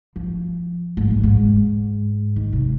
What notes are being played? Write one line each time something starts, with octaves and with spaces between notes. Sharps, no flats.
F3
G#2
A#2
G#2
D#3
C3